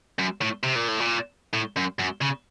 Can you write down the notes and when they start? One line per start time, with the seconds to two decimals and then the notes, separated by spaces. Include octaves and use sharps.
0.19 F#2
0.41 A2
0.63 C3
0.75 A#2
0.88 A2
1.00 A#2
1.53 A2
1.76 F#2
1.99 F#2
2.21 C#3